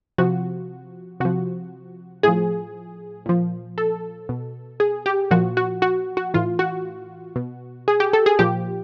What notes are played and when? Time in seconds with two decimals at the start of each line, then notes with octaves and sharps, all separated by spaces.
0.18 C3 F3 F#4
1.20 C3 F3 F#4
2.23 A2 F3 G#4
3.26 A#2 F3
3.78 A4
4.29 B2
4.80 G#4
5.06 G4
5.31 A#2 F3 F#4
5.57 F#4
5.82 F#4
6.17 F#4
6.34 A2 E3 F4
6.59 F#4
7.36 B2
7.88 G#4
8.00 G4
8.13 A4
8.26 G#4
8.39 A#2 F3 G4